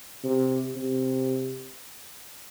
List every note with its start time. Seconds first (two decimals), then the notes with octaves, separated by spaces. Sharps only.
0.24 C3
0.76 C3